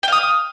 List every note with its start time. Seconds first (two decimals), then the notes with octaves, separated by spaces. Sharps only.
0.03 G5
0.08 F5
0.12 D#6